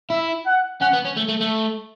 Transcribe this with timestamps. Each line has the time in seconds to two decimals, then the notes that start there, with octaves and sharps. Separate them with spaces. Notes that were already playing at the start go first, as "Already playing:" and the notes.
0.10 E4 E5
0.46 F#5
0.81 C#4 F#5
0.93 B3
1.05 C#4
1.16 A3
1.28 A3
1.41 A3